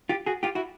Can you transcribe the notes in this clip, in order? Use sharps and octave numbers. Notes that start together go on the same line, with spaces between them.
F4 G4
F#4 G#4
F4 G4
E4 F#4